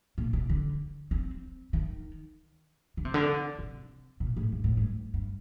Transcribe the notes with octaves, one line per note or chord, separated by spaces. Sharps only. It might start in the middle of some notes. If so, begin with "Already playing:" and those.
A#2
C3
D3
C4
D#3
D3
C3
D3
C3
A#2
A2
G2
A2
G2
G2